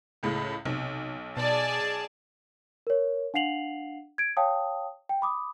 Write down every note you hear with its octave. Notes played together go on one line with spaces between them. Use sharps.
C#2 A2 C#3
B1 C3
B2 G#4 D5 A5
A#4 C#5
D4 F5 F#5 C7 F7 F#7
G#6 D7
C#5 F5 G5 A5 D#6
G5
B5 D6 D#6